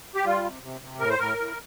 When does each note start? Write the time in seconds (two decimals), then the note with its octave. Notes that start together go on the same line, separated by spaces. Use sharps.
0.15 G4
0.25 G3 F4
0.44 C3
0.62 C3
0.81 C3
0.99 A2 A#4
1.10 C5
1.19 A2 A#4
1.38 A2